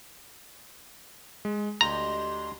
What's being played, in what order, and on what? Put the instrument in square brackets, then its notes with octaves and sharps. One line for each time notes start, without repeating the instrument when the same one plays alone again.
[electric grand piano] G#3
[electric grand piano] D2 [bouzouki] D4 G4 D#5 [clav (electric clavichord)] A#5 [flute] C6